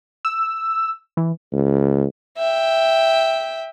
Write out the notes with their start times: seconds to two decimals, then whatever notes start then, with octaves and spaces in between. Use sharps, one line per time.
0.25 E6
1.17 E3
1.52 C#2
2.38 E5 G5